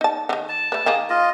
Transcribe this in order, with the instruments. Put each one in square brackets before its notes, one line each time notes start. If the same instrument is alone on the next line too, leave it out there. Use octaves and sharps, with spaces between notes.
[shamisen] D#4 A5
D3 D#3
[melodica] A5
[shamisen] A3 B4
D#3 A#3 G#4
[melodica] F4 D#5